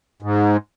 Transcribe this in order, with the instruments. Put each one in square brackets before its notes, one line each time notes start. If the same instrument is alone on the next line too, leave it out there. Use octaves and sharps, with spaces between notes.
[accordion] G#2